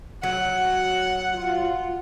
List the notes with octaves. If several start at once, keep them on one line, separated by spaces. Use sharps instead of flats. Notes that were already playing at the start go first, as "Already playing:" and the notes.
F#3 F#5
F4